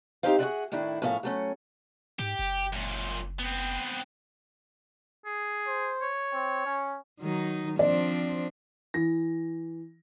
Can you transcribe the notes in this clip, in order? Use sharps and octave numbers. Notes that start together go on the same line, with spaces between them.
C4 D#4 G4 A#4 C5 F5
F#4 G#4 A#4 D5 E5 F#5
A2 D#3 D4 E4
A2 F3 C#4 A#4 F5
F#3 A3 C#4
G#2 G4
F#1
F#2 A#2
B3 C4
G#4
C5
C#5
C4
C#4
D#3 F#3 D#4
F3 C4 D4 D5
E3 A#6